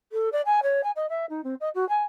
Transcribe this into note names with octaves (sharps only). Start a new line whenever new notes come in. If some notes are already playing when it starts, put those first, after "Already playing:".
A4
D5
G#5
C#5
G#5
D#5
E5
D#4
C4
D#5
F#4
G#5